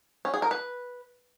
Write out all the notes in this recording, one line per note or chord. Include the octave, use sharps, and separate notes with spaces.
C#4
G#4
A#4
B4